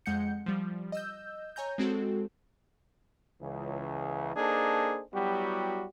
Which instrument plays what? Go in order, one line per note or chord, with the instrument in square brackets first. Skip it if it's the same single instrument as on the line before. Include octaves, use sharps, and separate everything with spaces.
[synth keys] F2 G#3 F#5 G6 C#7
F3 G3
D#5 E6 G6
C#5 G#5 A#5 G6
G#3 C4 F#4 A4
[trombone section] C#2 C#3 E3
A#3 D4 D#4 G#4 A4 C5
F#3 G3 B3 E4 F#4 G4